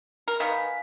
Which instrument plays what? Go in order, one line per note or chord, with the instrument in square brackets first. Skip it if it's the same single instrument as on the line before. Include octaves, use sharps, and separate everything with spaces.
[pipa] A#4
[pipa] D#3 B3 [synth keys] F5 G#5 B6